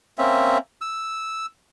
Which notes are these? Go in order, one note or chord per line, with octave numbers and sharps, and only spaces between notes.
A#3 C4 C#4 E5
E6